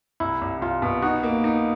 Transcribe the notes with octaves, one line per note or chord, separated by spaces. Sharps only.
C2 E4
C2
C2 F4
B2
D#4 F#4
A#3
D#4